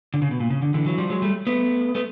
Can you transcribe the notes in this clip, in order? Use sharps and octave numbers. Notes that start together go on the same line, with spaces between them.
D3
C#3
B2
A#2
C#3
D3
D3 E3
E3 F#3
F3 G3
F#3 G#3
G3 A3
A3 B3
A3 B3